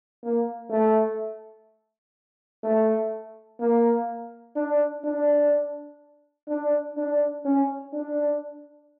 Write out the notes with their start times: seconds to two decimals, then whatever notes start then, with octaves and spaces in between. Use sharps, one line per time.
0.23 A#3
0.71 A3
2.63 A3
3.60 A#3
4.56 D4
5.04 D4
6.48 D4
6.97 D4
7.45 C#4
7.93 D4